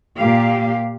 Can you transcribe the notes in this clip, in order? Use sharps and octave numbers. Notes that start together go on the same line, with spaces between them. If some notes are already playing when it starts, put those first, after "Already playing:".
A#2 A#3 G4 F5